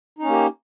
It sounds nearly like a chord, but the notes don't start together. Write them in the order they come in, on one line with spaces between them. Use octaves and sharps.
D#4 C#4 A#3 G4